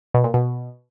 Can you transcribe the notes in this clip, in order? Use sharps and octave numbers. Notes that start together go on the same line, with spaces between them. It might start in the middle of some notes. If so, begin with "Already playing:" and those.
B2
A#2
B2